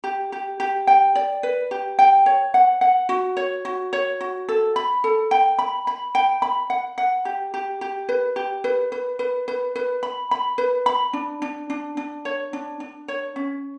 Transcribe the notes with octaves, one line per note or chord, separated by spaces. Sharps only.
G4
G4
G4
G5
D5
B4
G4
G5
C#5
F#5
F#5
F#4
C#5
F#4
C#5
F#4
A4
B5
A4
G5
B5
B5
G5
B5
F#5
F#5
G4
G4
G4
B4
G4
B4
B4
B4
B4
B4
B5
B5
B4
B5
D4
D4
D4
D4
C#5
D4
D4
C#5
C#4